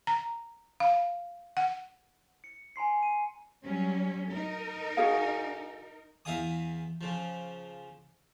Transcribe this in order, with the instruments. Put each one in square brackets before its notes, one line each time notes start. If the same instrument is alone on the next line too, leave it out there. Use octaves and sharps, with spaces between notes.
[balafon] A#5
F5
F#5
[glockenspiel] C#7
G#5 A#5 C6 C7
D#7
[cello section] F#3 G3 C#4
D#4 A#4
[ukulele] F#4 G#4 F5
[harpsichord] E2 E5 F5 G#5 D#6
C#3 F3